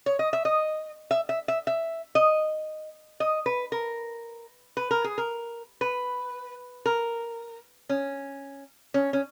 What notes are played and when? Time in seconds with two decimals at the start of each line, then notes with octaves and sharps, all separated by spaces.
0.06 C#5
0.19 D#5
0.33 E5
0.45 D#5
1.11 E5
1.29 E5
1.48 E5
1.67 E5
2.15 D#5
3.20 D#5
3.46 B4
3.72 A#4
4.77 B4
4.91 A#4
5.04 G#4
5.18 A#4
5.81 B4
6.86 A#4
7.89 C#4
8.94 C#4
9.13 C#4